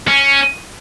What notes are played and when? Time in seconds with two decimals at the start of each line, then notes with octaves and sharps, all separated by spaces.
0.07 C#4